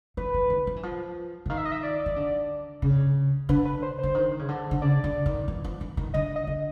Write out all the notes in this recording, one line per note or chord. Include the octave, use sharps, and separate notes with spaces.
E3 B4
E3
D#3
F3
E3
F3
D3
D#3 F5
E5
D#5
E5
D5
D#3
D3
C#3
D3 B4
B4
C5
D3 C5
D#3
C#3
D3
D3
C#3 D5
D3
D#3
E3
F3
E3
D#3
D3 D#5
D#5
D3